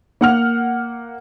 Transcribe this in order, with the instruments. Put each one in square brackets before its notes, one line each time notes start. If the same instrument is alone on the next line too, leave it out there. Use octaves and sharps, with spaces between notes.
[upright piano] A#3 F#5 F6